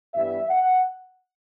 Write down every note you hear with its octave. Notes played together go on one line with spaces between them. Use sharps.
G2 E3 G3 B3 E5
F#5